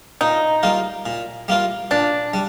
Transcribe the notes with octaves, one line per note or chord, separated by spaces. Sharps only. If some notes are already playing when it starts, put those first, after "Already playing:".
A#2 D#4
G3 A#3 F4
A#2
G3 A#3 F4
A#2 D4
G3